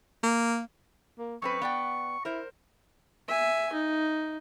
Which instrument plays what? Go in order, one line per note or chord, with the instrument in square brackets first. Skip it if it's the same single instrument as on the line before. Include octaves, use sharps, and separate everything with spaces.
[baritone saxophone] A#3
[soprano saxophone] A#3
[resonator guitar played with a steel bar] F#2 C4 B4 [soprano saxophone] C#6
[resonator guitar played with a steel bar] B3 D5 G5
[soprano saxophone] E4 [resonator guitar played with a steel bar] A#4 C5
[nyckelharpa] E5 G#5
D#4